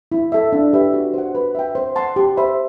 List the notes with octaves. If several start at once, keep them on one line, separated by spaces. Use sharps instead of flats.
E4
A4 E5
D4
G4 B4 E5
F#4
C5 F#5
B4
E5 G5
C5
F#5 A5 C6
G4
C5 E5 B5